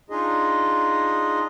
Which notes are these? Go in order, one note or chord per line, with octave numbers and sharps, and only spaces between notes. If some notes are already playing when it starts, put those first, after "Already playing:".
D4 D#4 F4 G#4 D#5